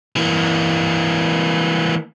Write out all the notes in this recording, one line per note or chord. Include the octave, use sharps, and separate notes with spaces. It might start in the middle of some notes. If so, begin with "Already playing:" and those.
E3 A#3